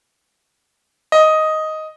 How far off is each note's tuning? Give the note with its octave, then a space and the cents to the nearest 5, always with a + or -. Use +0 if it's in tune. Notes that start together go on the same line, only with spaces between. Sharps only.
D#5 +5